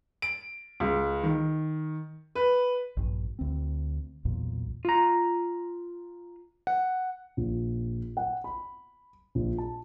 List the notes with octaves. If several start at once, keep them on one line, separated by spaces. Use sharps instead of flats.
D7
C#2
D#3
B4
A#1 G2
D2 C4
B1 E2 A#2
F4 A#5
F#5
A#1
F#5
B5
A#1
A5